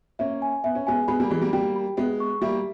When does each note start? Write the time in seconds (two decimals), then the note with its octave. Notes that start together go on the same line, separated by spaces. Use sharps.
0.19 A#3 C#4 E5
0.42 G#5
0.64 B3 E5
0.75 C#4
0.87 G#3 B3 G#5
1.08 G#3 B3 B5
1.20 G3 A#3
1.31 E3 G#3 B5
1.41 G3 A#3
1.53 G3 A#3 G5
1.76 B5
1.97 G#3 B3 E5
2.20 C#6
2.42 G3 A#3 E5